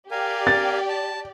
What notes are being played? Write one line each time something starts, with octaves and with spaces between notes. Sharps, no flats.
G4 A#4 D5 F5 G#5
A6
A5